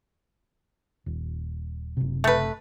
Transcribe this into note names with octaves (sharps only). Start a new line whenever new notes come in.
D#1
F#1 C3
A3 B4